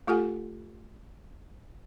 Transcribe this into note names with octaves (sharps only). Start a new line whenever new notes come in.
A3 F4 G4 A4 F#5 G#5